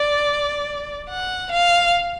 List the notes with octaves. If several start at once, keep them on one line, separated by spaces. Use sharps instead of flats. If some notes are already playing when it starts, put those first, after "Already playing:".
Already playing: D5
F#5
F5